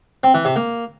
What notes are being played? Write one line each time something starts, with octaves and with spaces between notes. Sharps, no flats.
C4
E3
C3
A#3